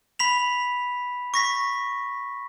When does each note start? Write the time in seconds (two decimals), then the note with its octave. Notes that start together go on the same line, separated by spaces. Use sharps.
0.19 B5 B6 F7
1.34 C#6 A#6 B6